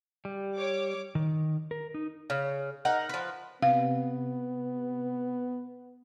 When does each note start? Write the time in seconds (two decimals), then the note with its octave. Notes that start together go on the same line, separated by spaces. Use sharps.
0.25 G3
0.57 C#5 D6
1.15 D#3
1.71 A#4
1.94 D#4
2.30 C#3
2.85 D#4 A#4 F#5
3.09 F3 B4
3.62 C3 B3 F5